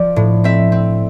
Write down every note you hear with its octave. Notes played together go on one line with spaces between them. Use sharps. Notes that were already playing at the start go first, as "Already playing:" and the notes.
Already playing: F3 D5
A2
C4 E5
C4